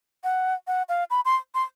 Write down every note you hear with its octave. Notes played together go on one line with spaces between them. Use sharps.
F#5
F#5
F5
B5
C6
C6